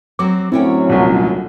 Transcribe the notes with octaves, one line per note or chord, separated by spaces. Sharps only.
F#3 C4 F#4 D6
F#2 A2 D3 F#3 C4 C#4 E4 G5
D#1 C2